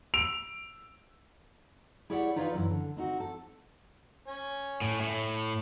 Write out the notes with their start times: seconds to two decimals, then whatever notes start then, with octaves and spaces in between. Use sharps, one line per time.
0.14 E6 D7 F7
2.10 E4 G4 G#4 C#5 D5 F#5
2.36 D#4 F4 B4 C#5 D5 F5
2.54 F#2 E3
2.70 D3
2.97 C4 D#4 F#4
3.20 A4
4.28 C#5 G#5
4.81 A2
5.00 A2